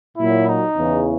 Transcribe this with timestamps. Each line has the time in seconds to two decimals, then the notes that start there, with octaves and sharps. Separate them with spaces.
0.17 A#2 F#3 E4
0.47 D#4
0.74 E2 C#3 E3